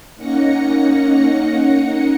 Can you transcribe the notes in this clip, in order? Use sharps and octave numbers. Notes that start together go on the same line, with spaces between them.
A#3 C#4 D#4 F#5 A#6 C#7